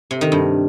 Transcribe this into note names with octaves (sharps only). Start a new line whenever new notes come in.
C3
D#3
G2